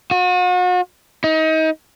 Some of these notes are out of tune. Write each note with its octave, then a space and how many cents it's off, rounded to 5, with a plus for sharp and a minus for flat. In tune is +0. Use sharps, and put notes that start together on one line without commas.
F#4 -40
D#4 +30